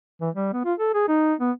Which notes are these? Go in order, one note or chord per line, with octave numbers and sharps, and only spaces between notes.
E3
G3
B3
F4
A4
G#4
D#4
B3